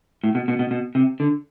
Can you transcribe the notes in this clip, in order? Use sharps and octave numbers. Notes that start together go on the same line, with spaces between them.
A2
B2
B2
B2
B2
C3
D3